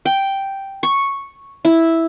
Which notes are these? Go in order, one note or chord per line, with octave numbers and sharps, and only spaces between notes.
G5
C#6
E4